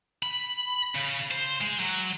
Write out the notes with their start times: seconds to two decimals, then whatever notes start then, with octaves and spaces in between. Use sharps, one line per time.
0.23 B5
0.95 C#3
1.31 C5
1.62 G#3
1.80 F#3